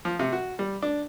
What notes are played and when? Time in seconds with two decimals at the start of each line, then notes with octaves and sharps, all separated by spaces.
0.05 F3
0.19 C3
0.32 F#4
0.59 G3
0.82 D4